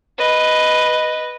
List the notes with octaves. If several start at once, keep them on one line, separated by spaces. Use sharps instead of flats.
B4 D#5